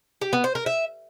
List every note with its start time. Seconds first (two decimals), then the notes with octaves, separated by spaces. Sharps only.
0.21 G4
0.33 B3
0.44 C5
0.55 A#4
0.66 E5